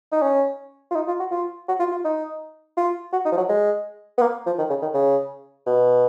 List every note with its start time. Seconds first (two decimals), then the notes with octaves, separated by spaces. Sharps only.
0.12 D#4
0.22 C#4
0.90 F4
0.95 D#4
1.08 F4
1.20 F#4
1.31 F4
1.68 F#4
1.79 F4
1.91 F4
2.04 D#4
2.77 F4
3.12 F#4
3.25 D#4
3.32 F3
3.37 F#3
3.49 G#3
4.18 B3
4.21 A#3
4.46 F3
4.58 D#3
4.69 C#3
4.82 D#3
4.94 C#3
5.66 B2